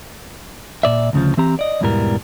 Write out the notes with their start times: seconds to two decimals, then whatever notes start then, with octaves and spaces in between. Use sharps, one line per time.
0.83 A#2 D5 E5
1.13 D2 C#3 F3
1.37 E3 C4 G4 A#5
1.59 D5 D#5
1.81 E2 G#2 B2 E3 G3 A#4